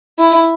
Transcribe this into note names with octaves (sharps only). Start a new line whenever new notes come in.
E4